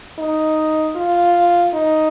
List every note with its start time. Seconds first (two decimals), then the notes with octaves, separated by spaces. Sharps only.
0.19 D#4
0.96 F4
1.74 D#4